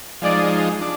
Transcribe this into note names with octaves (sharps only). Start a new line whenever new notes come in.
F3 G#3 D#4 D5
D4